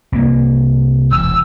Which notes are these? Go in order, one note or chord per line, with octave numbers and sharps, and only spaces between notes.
C2 A#3
E1 E6